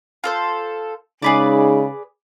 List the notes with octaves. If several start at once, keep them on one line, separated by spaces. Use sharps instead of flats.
F4 A4 C5
C#3 G#3 D#4 G#4 B4 D5